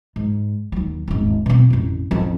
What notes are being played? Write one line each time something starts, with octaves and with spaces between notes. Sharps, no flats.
G#2
D#2 F#3
D#1 G#1
B2 C4
A1 F2
A1 F2